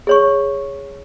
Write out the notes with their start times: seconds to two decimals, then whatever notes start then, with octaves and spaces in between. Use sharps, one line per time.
0.07 G#4 C#5 C#6